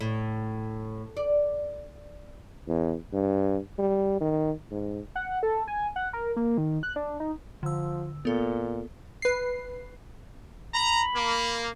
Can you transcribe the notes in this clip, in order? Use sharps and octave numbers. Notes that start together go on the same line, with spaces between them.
A2
D5
E2
G2
G3
D#3
G#2
F#5
A4
G#5
F#5
A#4
A#3
D#3
F#6
D4
D#4
D3 F3 E6
A#2 B3 A4
B4 C7
A#5 B5
A#3